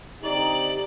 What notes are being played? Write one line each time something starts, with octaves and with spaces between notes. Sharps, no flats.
D3 C4 D#4 G4 D5 F#7